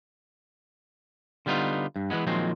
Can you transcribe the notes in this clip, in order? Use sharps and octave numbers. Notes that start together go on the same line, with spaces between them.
D3 G3 B3 D#4 F4
G2
E3 F#3 G#3 B3
A#2 D#3 F3 F#3 G#3 C4